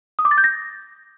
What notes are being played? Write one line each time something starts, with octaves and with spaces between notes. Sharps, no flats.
D#6
D6
A6
G6
A#6